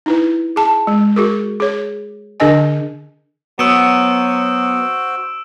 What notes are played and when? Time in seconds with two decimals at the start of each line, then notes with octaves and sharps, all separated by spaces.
0.06 D#4 E4 B4
0.56 G#4 A5
0.87 G#3
1.16 F#4 G#4 A#4
1.60 G#4 C#5
2.40 D3 D4 A#4 D#5 G#5
3.59 F#3 B3 F#4 C5 E6 D7 E7